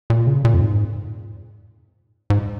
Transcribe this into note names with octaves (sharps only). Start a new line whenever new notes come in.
A#2
C#3
A#2
F2
G#2
G#2